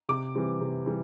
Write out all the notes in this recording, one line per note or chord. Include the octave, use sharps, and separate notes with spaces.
C3 D6
E3 G3 C4
C3
E3 G3